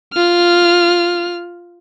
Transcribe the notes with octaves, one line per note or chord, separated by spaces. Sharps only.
F4 F6